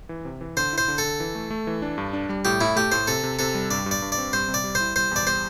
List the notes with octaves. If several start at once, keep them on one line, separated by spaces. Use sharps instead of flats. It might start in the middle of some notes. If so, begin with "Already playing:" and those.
E3
C3
E3
D3 C5
E4 C5
D3
A4
D3
E3
A3
A3
E3
D4
G2
D4
G3
A2 G4
A2 E4
A3 G4
A2 C5
C3 A4
C3
C3 A4
G3
G2 D5
G2
D5
G2
D5
C4
G3 C5
C3
D5
G3
C5
E4
G3 C5
E2 D5
G3 C5